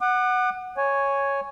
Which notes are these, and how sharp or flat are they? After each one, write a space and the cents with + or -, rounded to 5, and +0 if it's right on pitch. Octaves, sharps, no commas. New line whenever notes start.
F#5 +0 D6 +45
C#5 +0 G#5 +0